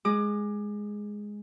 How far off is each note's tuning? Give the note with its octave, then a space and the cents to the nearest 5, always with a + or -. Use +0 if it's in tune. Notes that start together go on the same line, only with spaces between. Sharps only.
G#3 +0 G#4 +0 D6 +25